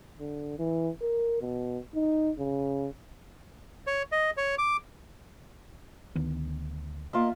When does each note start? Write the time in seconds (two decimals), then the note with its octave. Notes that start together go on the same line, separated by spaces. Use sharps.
0.20 D3
0.59 E3
1.02 A#4
1.42 B2
1.95 D#4
2.39 C#3
3.87 C#5
4.12 D#5
4.37 C#5
4.58 D6
6.15 D2 D#3 B3
7.13 A#3 F4 D#5 E5